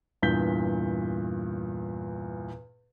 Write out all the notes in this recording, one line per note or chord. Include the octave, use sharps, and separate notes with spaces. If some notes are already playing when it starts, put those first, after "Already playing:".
E2 G2 A#2 G6 B6 G7